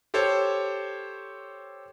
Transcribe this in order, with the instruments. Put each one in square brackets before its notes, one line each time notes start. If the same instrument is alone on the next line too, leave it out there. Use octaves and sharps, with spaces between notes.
[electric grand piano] G4 A4 C5 C#5